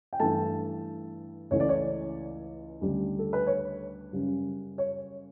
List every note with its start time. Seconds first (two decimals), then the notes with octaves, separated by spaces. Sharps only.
0.13 G5
0.20 G2 E3 A3 A5
1.51 C#2 C#3 E3 A3 C#5
1.60 D5
1.69 C#5
2.81 D2 C#3 G3
3.19 A4
3.33 B4
3.47 C#5
4.13 F#2 C#3 G3
4.78 C#5